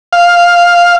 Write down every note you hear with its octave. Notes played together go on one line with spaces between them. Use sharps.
F5